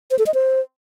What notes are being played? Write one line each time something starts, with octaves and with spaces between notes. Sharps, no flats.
C5
A4
D#5
C5